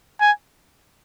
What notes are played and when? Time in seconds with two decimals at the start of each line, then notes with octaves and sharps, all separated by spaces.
0.21 G#5